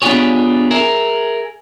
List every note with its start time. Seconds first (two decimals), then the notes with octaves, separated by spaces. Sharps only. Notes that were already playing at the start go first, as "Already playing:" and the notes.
0.02 B3 D4 F4 G4 G#4 C#5
0.71 G#4 A#4 E5